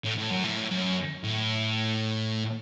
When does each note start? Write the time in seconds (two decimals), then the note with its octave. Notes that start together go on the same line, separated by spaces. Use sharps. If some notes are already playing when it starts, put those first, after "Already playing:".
0.05 A2
0.18 A2
0.31 F#2
0.44 A2
0.71 F#2
1.24 A2